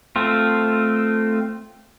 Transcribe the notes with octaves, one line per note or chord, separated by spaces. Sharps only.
A3 C4 F4